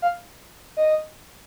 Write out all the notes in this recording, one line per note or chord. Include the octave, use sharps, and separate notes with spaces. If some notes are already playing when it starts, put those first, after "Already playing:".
F5
D#5